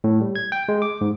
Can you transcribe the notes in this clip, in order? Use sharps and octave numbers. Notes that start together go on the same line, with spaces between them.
A2
G3
G#6
G5
G#3
D6
G#2